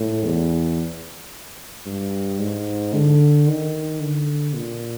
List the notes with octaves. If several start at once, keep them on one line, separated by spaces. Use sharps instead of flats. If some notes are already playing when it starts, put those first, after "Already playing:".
Already playing: A2
E2
G2
G#2
D3
D#3
D3
A#2